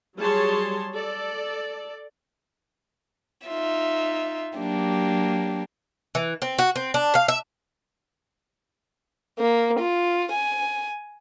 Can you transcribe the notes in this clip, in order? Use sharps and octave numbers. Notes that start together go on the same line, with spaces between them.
F#3 G3 G#4 C#5 A5 C6
A4 D5
D#4 F4 E5
F#3 A#3 D4 G4
E3
C4
F#4
C4
D4
F5
E5
A#3
F4
G#5